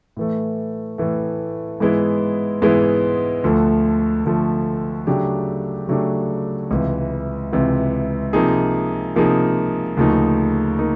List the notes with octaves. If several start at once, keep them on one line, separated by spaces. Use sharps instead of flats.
A2 E3 A3
A2 E3 A3
G#2 E3 G#3 B3 E4
G#2 E3 G#3 B3 E4
D2 D3 F3 A3
D2 D3 F3 A3
C#3 F#3 A3 D4 G4
C#3 F#3 A3 D4 G4
C#2 C3 E3
C#2 C3 E3
C3 F3 A#3 D#4 G#4
C3 F3 A#3 D#4 G#4
D2 C#3 F3 A#3 D#4
A#3 D#4